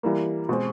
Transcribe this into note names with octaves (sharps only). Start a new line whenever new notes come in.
E3 G3 A#3
B2 G#3 C4